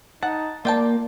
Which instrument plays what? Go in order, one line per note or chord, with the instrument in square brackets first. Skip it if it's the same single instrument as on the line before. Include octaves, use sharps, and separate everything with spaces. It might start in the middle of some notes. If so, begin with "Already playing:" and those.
[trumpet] D#4 [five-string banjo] F#5 [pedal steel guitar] A5
[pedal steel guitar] A#3 [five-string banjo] F4 G5 A5 [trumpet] D5